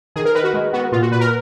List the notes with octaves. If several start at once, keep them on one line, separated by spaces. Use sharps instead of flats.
D#3 G#4
A#4
D#3 B4
F#4
G#3
B3 F#4
A#2 F4
F#4
A#2 B4
A#4